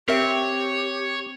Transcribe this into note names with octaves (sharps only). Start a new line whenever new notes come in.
C4 G4 A#4 C#5 E5